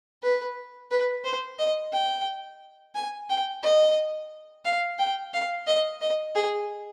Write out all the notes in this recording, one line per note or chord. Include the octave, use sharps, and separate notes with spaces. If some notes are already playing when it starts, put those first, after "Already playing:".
B4
B4
C5
D#5
G5
G#5
G5
D#5
F5
G5
F5
D#5
D#5
G#4